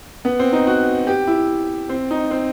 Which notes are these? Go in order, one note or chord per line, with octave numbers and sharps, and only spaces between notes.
B3
C4
D#4
F#4
G4
E4
C4
D#4
C4